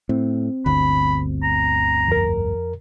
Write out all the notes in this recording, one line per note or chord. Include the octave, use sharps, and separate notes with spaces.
A2 C4
G1 D2 B5
A#5
F2 A#4